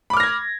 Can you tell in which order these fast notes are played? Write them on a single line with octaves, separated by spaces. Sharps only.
B5 D6 F6 A#6 G#6